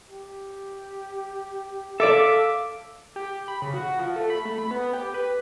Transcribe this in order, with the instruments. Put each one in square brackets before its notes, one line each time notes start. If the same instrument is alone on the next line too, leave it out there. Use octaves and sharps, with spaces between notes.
[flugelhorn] G4
[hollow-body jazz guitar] A4 D5 [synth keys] E5 D6 [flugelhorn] F5
[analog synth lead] G4
B5
C#3
F#4
F3
A3
B5
A3
B5
B3
G4
B4